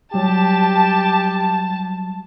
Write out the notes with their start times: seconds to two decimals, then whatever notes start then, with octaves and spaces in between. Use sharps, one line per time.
0.14 F#3 G3 G4 A5